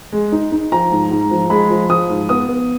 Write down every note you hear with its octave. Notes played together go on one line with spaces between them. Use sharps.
G#3
D#4
D#4
F3 A#5
G#2
G#2
F3
G#3 B5
F3
F3 D#6
G#2
B3 D#6
B3